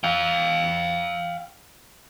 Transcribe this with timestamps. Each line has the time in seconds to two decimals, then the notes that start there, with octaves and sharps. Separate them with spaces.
0.04 F5 G5